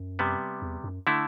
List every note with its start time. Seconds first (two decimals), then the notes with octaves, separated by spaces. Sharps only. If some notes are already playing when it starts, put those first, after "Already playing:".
Already playing: F#2
0.19 C3 G3 B3
0.62 E2
0.84 F#2
1.07 D3 A3 E4